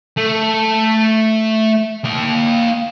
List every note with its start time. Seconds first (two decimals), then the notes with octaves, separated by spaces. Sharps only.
0.17 A3
2.05 A#3 G5